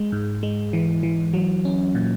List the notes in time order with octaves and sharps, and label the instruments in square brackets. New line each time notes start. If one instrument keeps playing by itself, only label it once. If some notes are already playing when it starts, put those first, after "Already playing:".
Already playing: [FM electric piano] G#3
G#2
G#3
E3
E3
F#3
C#4
A#2